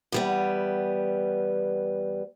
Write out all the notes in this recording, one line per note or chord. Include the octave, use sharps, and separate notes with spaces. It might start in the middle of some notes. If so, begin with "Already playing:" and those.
E2 G3 B3